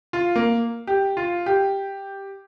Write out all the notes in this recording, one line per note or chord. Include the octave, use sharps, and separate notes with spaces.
F4
A#3
G4
F4
G4